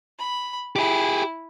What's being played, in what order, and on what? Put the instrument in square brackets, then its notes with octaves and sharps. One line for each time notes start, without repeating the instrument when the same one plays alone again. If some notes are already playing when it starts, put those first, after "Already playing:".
[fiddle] B5
[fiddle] E4 [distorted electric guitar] G4 G#4